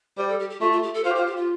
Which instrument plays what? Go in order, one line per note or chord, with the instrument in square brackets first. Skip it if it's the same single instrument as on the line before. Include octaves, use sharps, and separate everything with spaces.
[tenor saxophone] G3 [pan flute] C5
[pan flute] A4
G4
G4
[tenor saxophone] A3 [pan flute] F4
[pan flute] F4
G4
A4
[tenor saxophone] F4 [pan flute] C5
[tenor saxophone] G4
[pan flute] C5
[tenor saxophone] F4
[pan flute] G4
F4